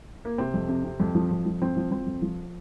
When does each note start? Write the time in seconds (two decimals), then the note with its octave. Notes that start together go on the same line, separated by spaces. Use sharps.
0.25 A#3
0.38 C3 C4
0.54 F2
0.69 C3
0.84 C3
1.00 F2
1.15 F3
1.31 F2
1.46 F3
1.62 F3 C4
1.77 F3
1.91 F3 C4
2.06 F2
2.22 F3